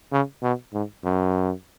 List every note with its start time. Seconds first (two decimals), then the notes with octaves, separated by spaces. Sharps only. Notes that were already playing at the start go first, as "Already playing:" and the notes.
0.12 C#3
0.43 B2
0.73 G#2
1.04 F#2